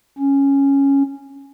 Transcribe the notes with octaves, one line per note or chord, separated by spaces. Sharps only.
C#4